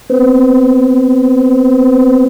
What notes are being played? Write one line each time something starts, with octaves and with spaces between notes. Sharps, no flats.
B3 C4